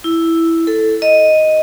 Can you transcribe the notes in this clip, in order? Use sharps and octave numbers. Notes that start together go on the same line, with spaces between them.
E4
A4
D#5